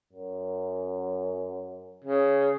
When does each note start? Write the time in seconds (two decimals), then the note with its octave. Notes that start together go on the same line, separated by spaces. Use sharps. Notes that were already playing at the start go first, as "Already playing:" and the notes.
0.13 F#2
2.04 C#3